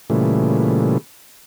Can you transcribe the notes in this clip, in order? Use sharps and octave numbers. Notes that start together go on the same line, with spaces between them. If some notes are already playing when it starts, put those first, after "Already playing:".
A#2 C#3 E3 G3 A3